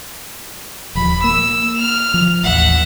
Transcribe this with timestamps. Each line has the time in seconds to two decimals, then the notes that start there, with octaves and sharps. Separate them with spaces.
0.95 D#1 F3 B5
1.24 A#3 E6
1.77 F6 F7
2.14 F3
2.44 A1 D#2 E5 F#5